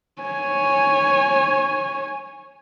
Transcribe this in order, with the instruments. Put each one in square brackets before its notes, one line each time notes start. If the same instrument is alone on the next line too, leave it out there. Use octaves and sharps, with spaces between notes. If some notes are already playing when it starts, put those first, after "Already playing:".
[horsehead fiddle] C#5 G#5